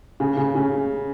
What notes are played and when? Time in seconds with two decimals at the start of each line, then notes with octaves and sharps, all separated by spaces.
0.20 C#3
0.37 C#3
0.55 C#3